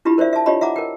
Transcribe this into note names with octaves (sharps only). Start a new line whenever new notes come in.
D4 E4 F4 G4 B5
A#4 C5 D5 E5 F5
E5 A5
D4 F4 G4 C#5 D#5 B5
E5 F#5 A#5 D6
A#4 G5